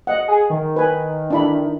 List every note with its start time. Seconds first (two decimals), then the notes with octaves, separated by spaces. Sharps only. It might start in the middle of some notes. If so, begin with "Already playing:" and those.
0.07 D#5 F#5
0.28 G#4
0.50 D#3
0.76 B4 G#5
1.31 D4 E4 B5